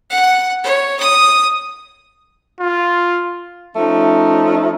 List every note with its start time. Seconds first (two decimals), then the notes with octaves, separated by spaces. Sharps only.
0.10 F#5
0.64 C#5
1.00 D#6
2.60 F4
3.75 F3 A3 C#4 D#4